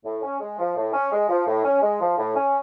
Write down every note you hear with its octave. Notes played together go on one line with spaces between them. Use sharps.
A2
C#4
G#3
F3
A2
C#4
G#3
F3
A2
C#4
G#3
F3
A2
C#4